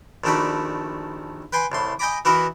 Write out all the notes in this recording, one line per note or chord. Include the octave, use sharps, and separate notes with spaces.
A#1 D#3 A3 F#4 D5 B5
B4 G5 G#5 C6
C2 A2 C6
D#5 G5 G#5 A#5 B5 D6
E3 E4 F#4 A#4 B4 D#5